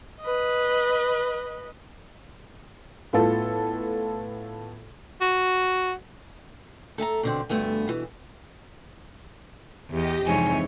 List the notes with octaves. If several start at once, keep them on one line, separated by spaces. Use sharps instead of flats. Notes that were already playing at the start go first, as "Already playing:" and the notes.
B4 D#5
A2 B3 F4 A4
F#4
A4 E5 G#5 A#5
B2 D3 C4
D2 G2 A3 B3 G#5
B2 E3
E2 G4 D#5 G5
F2 G#2 C3 E3 D4 D#4 C#5 G#5